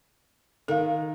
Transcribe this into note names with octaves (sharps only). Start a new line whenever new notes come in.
D#3 A4 F5